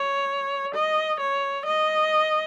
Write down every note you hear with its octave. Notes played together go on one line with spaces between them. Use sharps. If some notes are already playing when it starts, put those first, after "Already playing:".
Already playing: C#5
D#5
C#5
D#5